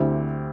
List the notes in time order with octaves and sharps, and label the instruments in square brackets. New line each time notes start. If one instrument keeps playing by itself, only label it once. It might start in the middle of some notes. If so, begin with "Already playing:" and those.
Already playing: [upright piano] D2 D3 C4 E4 G4